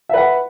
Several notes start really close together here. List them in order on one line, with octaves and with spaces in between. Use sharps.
E5 B4 F#5